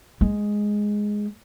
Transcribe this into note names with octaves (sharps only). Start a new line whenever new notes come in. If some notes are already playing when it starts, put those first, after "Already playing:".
G#3